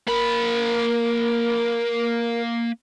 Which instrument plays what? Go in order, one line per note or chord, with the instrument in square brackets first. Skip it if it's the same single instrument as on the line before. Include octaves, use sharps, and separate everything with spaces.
[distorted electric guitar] A#3 B5 [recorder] A#4